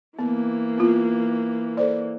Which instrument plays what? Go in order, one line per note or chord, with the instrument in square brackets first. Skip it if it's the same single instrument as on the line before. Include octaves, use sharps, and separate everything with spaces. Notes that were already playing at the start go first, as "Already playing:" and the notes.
[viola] E3 A#3 [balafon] B3
[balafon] B3 F4
A4 C5 D5